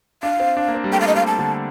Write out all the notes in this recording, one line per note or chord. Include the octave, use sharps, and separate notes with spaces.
D4 F5
C4
D4
A#3
C4
G3
A3 G5
F5
D#5
G3 F5
A5
D3